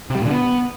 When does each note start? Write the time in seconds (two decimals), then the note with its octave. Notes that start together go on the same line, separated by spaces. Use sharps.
0.10 C3
0.15 G3
0.20 A#2
0.26 D3
0.31 B3